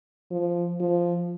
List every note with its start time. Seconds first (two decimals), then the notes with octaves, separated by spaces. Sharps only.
0.31 F3
0.80 F3